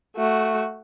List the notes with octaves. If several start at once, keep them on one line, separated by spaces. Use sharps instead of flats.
A3 F#4